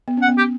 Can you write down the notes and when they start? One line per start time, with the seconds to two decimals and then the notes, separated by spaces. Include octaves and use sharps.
0.08 B3
0.17 C#4 F#5
0.28 B3
0.37 G4